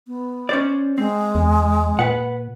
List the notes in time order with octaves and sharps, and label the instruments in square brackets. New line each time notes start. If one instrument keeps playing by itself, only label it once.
[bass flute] B3
[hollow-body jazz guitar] C#4 C5 D5
[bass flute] G#3 [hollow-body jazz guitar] C4
[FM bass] E2
[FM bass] A#2 [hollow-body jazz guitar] B4 F#5